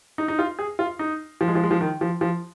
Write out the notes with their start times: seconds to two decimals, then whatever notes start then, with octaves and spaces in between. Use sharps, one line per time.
0.18 D#4
0.28 D#4
0.39 F4
0.59 G#4
0.79 F4
0.99 D#4
1.41 F3
1.48 G#3
1.55 F3
1.63 G#3
1.71 F3
1.81 D#3
2.01 F3
2.21 F3